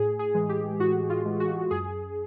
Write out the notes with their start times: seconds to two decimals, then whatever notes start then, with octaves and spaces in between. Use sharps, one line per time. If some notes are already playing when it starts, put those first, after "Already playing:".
Already playing: A2 G#4
0.19 G#4
0.34 E3 G#3
0.49 G4
0.80 A2 F#4
1.10 F4
1.25 E3 G#3
1.40 F#4
1.71 F#2 G#4